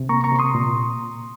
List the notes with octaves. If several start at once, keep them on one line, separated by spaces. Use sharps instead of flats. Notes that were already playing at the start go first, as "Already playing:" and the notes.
Already playing: C3
A#3 A#5 C#6
A#5 C#6
C3
C6 D#6
A#2